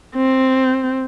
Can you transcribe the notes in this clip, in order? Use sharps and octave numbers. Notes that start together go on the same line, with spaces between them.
C4